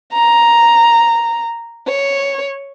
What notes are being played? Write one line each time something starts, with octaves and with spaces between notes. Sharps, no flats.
A#5
C#5